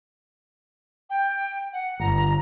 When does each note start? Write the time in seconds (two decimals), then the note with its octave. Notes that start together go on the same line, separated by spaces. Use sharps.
1.10 G5
1.73 F#5
2.00 G1 A#5